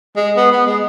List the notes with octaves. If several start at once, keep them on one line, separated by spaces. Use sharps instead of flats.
G#3
B3
B3
G#3